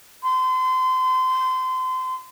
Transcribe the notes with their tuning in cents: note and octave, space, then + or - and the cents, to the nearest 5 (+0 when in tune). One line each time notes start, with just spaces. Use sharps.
C6 -30